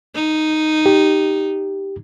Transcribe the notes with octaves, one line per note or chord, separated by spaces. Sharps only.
D#4
G4